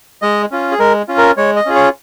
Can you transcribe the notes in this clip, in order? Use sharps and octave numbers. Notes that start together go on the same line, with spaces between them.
G#3 D#5
C#4 F4
G#4
G#3 A#4
C#4 F4
A#4
G#3 C#5
D#5
C#4 F4 G#4
C#5